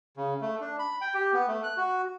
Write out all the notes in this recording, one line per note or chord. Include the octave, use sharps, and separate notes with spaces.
C#3
A3
D4
B5
G5
G4
B3
A3
F#6
F#4